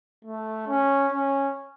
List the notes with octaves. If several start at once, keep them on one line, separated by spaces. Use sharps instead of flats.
A3
C#4
C#4